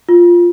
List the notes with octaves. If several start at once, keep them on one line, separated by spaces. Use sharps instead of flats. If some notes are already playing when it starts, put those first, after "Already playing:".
F4